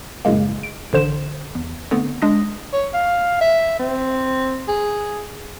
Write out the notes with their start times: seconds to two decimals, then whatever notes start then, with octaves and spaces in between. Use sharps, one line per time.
0.25 F#2 A2 C#3 G#3 A#3
0.63 D7
0.93 A1 D3 C5 E7
1.55 E2
1.91 D3 A3 B3 C4
2.22 G#3 D4 D#6 A#6
2.73 C#5
2.94 F5
3.41 E5
3.79 C4
4.68 G#4